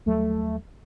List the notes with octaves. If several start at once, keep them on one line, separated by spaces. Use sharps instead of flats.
D#2 F#3 G3 A3